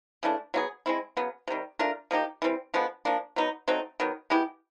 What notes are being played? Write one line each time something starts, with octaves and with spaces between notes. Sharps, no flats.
C#3 E3 A3 D4
F#3 B3 E4 G#4
G#3 C4 E4
C#3 F#3 B3
C3 D#3 G3
A3 D4 F4 A#4
F3 A#3 D#4 G4
E3 G3 C4
D3 F3 G#3 B3
F3 A#3 D4
F#3 B3 D#4
F#3 A3 C4 D#4
D#3 F#3 B3
G#3 B3 E4 G4